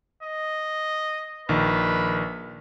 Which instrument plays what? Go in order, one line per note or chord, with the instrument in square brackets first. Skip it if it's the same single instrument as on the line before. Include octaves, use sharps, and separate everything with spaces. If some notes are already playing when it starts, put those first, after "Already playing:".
[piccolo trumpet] D#5
[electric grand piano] A#1 D#3 [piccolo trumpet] B4